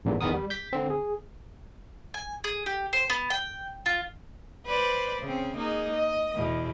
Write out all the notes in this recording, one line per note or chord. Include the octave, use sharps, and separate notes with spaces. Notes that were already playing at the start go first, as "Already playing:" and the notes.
A1 E2 G2 A#2
E2 D#3 E3 B3 A#4 D#6
G3
G6 B6
D3 C4
G#4
G#5
G#4
G4
C5
B3
G5
F4
B4 C5 D5
C#3 C4
A#3 D#4 G#4
D#5
E2 B2